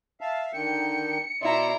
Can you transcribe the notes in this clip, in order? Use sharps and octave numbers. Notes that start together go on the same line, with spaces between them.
E5 F5 A5
D3 D#3 G5 C#7
B2 E4 D5 A#5 C6